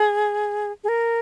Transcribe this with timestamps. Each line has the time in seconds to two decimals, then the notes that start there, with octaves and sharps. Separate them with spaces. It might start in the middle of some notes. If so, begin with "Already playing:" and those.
Already playing: G#4
0.84 G#4
0.89 A#4